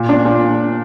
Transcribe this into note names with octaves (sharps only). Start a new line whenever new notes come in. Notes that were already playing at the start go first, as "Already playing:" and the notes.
Already playing: A#2
D4
A#2